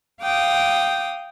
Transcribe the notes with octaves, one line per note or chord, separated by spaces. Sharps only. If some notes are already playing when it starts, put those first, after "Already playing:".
F5 G5 D6 D#6